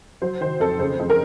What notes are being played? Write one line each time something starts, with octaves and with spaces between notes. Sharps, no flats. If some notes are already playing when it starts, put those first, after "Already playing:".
F#3 C5
D#3 C5
F2 A4
C#3 C5
F2
A#4